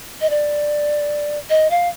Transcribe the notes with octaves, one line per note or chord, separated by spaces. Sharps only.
D#5
D5
D#5
F5